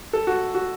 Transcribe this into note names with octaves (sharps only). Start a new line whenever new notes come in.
A4
F#4
F#4